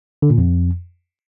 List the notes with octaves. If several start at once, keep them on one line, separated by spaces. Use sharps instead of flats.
D3
A#2
F2